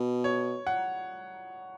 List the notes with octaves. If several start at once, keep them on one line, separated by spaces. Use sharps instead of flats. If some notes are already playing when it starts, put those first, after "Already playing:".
Already playing: B2
C#5
F#5